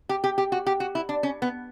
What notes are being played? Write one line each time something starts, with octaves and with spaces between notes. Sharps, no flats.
G4
G4
G4
F#4
G4
F#4
E4
D4
C#4
B3